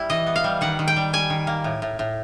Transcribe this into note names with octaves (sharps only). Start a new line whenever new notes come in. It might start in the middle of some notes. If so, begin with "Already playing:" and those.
Already playing: G3 E4
E3 D#5
B3
F5
G3
D#3 F#5
D#3
G5
G3
G3 G#5
D#3
A#3
A2
A2
A2